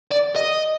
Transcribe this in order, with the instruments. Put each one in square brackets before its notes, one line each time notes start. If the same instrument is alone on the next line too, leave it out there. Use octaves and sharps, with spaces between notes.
[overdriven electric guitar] D5
D#5